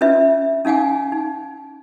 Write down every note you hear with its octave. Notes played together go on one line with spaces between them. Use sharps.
C#4 D4 F4 B4 E5
C#4 D#4 F5 F#5 G#5
D#4